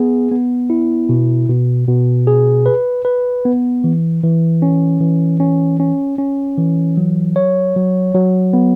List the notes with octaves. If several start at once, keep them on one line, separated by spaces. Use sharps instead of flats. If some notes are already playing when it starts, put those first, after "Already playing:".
Already playing: B3 G#4
B3
E4
B2
B2
B2
G#4
B4
B4
B3
E3
E3
C#4
E3
C#4
C#4
C#4
E3
F#3
C#5
F#3
F#3
B3